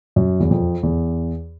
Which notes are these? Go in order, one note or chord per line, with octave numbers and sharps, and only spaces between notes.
F#2
E2
F2
E2